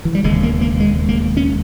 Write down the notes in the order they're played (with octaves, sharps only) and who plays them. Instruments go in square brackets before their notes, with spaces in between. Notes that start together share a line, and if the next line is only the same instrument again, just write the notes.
[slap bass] E3
G3
E1 D#2 C#3 G#3
A#3
A#3
G#3
A#3
C#4